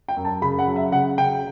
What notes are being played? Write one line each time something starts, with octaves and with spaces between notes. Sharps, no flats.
G5
F#2
A5
C#3 B5
F#5
F#3
E5
C#3 F#5
C#3 G5